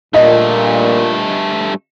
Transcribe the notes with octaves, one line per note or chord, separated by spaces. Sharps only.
G2 A#2 A3 D#5